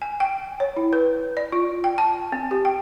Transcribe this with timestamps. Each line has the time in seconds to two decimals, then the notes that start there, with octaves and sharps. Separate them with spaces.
0.02 G#5
0.20 G5
0.60 C#5
0.76 E4
0.93 B4
1.37 D5
1.52 F4
1.84 G5
1.98 A5
2.32 C4
2.51 G4
2.65 G5